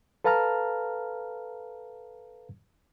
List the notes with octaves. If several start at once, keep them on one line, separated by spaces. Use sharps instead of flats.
A4 B4 F5 A5 A#5 F6